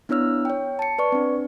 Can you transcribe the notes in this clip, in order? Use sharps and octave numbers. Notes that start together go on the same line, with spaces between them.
B3 D4 E4 C#5 E6 F6
C#5 G5
A5 C#7
B4 D5 C#6
C4 D4